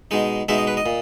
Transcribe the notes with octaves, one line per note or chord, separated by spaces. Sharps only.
B2 G#3 D#4
B2 G#3 D#4 E5
D#5
B4
D#5
A#2